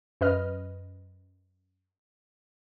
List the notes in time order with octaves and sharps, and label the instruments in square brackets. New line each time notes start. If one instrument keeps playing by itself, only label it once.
[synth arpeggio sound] F#2 B4 D#5 F6